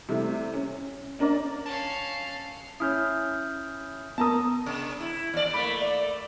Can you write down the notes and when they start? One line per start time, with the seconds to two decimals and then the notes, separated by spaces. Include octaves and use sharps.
0.09 C3 G3 A3 E4
0.54 C#4
1.19 C#4 D4 A#4 D5 D#5
1.66 C#4 F5 A5
2.80 C#4 E4 D#6 F6 G6
4.18 B3 A#4 A5 A#5 D#6
4.66 C3
5.00 E4
5.34 D#2 D5
5.54 A3 A#3 B5
5.81 D5